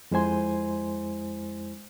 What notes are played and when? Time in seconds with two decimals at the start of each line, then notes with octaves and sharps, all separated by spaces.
0.11 F2 G#3 E4 C5 G#5 C6